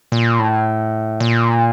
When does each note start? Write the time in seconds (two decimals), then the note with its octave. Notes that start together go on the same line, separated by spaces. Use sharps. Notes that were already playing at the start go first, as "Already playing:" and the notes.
0.12 A#2
0.39 A2
1.20 A#2